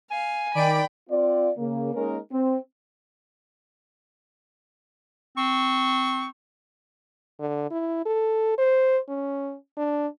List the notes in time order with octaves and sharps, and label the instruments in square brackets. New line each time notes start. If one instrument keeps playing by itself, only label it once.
[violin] F5 [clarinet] G#5
[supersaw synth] D#3 D5 D7 [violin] G5 B5
[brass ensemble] C4 F4 D5
C#3 A#3
G#3 A#3 C#4 D#4 A#4
C4
[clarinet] C4 [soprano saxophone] C#6
[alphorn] D3
E4
A4
C5
C#4
D4